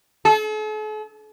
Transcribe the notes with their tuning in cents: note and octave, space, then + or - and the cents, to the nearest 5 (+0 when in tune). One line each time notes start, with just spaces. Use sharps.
A4 -45